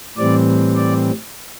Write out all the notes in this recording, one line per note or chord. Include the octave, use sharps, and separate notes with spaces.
A2 E3 G3 C4 D5
D5